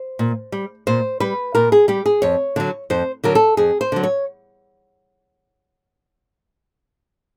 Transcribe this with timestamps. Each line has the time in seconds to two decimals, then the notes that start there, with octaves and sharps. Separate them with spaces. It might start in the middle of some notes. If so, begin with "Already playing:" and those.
Already playing: C5
0.19 A#2
0.52 G3
0.87 A#2 C5
1.20 G3 B4
1.55 A#2 A#4
1.72 G#4
1.88 G3 G4
2.06 G#4
2.22 F2 C#5
2.56 D3 F#3
2.90 F2 C5
3.24 D3 F#3 A#4
3.35 A4
3.57 F2 G#4
3.81 C5
3.92 D3 F#3
4.03 C#5